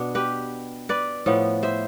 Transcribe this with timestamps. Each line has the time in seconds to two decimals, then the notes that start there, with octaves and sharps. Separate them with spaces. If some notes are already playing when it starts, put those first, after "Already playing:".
Already playing: B2 B3 D4
0.15 G4 B4
0.89 B4 D5
1.26 A2 F3 B3
1.63 C5 E5